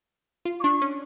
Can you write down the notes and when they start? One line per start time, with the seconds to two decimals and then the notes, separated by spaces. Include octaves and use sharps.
0.45 F4
0.60 D6
0.63 D4 C#6
0.82 C#4